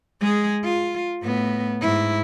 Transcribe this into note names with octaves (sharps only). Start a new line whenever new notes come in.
G#3 G#4
F4
A2 B3
G#2 E4